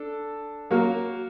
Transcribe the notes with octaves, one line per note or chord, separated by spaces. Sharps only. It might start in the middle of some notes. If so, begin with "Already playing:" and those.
Already playing: D4 A4
F#3 A#3 F#4 A#4